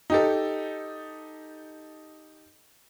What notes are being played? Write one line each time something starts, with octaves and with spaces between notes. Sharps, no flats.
D#4 G4 A4